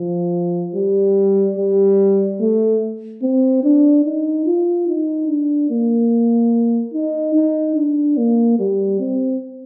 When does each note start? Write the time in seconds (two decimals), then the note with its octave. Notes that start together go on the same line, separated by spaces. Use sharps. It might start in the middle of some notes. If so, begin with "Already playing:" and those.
Already playing: F3
0.75 G3
1.57 G3
2.40 A3
3.22 C4
3.64 D4
4.05 D#4
4.46 F4
4.87 D#4
5.28 D4
5.70 A#3
6.94 D#4
7.35 D#4
7.76 D4
8.17 A#3
8.59 G3
9.00 C4